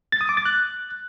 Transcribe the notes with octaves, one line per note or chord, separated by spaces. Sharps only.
A6
D#6
D6
A6
F#6